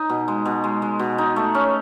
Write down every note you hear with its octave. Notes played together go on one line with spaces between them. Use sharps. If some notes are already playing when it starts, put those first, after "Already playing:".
Already playing: D#4
B2
G#3
B2
G#3
G#3
B2
D#4
A3
C#4